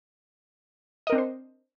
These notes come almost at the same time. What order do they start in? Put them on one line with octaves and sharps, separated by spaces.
D#5 A#4 C4 D4 C5